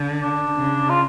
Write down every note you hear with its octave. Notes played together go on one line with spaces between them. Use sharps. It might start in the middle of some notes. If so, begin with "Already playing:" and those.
Already playing: D3
D4
C#3
F4